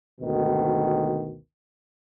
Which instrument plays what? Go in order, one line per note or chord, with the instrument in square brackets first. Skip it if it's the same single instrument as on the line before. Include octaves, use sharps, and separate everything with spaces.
[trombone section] G#1 D2 B2 D#3